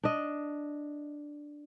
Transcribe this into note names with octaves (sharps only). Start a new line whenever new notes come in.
D4 D#5